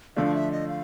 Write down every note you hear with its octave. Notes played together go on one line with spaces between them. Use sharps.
D3 F3 A3 D4 F5
E5
D#5
F5